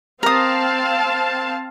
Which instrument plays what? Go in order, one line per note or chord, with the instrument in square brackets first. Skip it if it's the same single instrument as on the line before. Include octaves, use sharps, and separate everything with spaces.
[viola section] C4 F5 A5 [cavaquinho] A#4 D#6